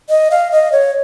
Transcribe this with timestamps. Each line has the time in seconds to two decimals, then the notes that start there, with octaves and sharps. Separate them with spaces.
0.09 D#5
0.31 F5
0.52 D#5
0.72 C#5